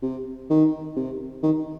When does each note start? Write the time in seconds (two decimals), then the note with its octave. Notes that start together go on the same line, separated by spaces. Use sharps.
0.02 C3
0.50 D#3
0.96 C3
1.43 D#3